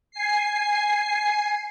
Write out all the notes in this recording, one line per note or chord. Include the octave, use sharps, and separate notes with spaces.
G#5 C7